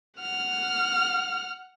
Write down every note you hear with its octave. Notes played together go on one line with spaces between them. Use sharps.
F#5 F6